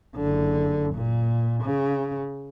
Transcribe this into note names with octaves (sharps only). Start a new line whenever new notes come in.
F#1 D3
A#2
C#3